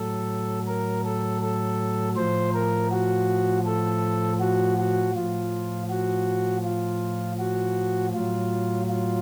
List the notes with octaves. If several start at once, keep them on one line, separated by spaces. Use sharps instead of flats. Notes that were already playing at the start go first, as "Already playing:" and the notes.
Already playing: A2 F#3 A4
A#4
A4
A4
A2 F3 C5
A#4
F#4
A4
F#4
F#4
A2 F3 F4
F#4
F4
F#4
A2 F#3 F4
F4